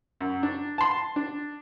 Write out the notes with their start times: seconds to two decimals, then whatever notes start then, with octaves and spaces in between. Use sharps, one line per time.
0.21 F#2
0.43 D4
0.78 A5 C6
1.16 D4